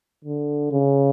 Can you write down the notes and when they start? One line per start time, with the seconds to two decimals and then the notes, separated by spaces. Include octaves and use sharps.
0.25 D3
0.72 C#3